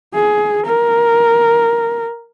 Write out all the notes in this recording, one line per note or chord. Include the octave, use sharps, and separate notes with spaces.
G#4
A#4